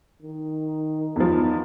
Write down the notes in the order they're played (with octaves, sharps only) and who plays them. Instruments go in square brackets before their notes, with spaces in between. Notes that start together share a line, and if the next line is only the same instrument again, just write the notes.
[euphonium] D#3
[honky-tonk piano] E2 F3 [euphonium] D#4